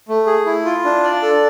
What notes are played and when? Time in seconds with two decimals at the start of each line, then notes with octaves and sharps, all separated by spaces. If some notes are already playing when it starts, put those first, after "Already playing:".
0.08 A3
0.26 G#4
0.46 E4
0.65 F4
0.84 D4
1.04 D5
1.22 A4